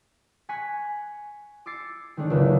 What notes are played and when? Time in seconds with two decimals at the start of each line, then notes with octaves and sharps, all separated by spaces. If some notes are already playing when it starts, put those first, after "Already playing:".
0.49 G#5 C#6 F#6 G#6 B6 D#7
1.66 D6 E6 G#6 A6 C7 C#7
2.17 D#3 G#3 A3 C#4 D4
2.30 F#1 C#2